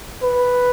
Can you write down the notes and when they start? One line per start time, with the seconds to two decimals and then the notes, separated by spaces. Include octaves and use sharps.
0.23 B4